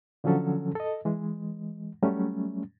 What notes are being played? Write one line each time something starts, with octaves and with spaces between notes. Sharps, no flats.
D3 F3 F#3 C#4 A4
A4 D#5
E3 G#3
F#3 G3 A3 C#4